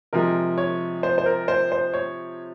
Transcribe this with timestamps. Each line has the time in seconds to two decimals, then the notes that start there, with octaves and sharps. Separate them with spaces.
0.13 C3 F3 G#3 A#4
0.58 C#5
1.03 C5
1.18 C5
1.26 A#4
1.48 C5
1.72 C5
1.94 C#5